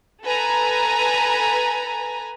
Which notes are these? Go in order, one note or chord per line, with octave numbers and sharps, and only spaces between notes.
A4 B4 G#5 A#5